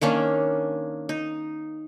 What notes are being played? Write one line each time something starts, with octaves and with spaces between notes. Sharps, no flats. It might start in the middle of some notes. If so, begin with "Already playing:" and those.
D#3 A#3 C#4 D4
D#4